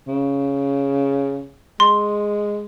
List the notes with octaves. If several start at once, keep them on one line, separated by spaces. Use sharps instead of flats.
C#3
G#3 C6